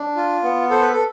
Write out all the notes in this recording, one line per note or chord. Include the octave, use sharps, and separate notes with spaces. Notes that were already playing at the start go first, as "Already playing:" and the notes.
Already playing: D4
F4
B3
A4 C5
B4
A4